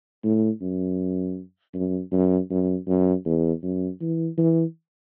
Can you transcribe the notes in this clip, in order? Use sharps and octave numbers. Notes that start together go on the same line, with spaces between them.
A2
F#2
F#2
F#2
F#2
F#2
E2
F#2
E3
E3